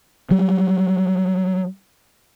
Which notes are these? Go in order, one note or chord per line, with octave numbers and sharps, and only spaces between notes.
F#3 G3